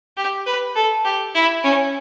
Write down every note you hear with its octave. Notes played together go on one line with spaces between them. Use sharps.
G4
B4
A4
G4
E4
C#4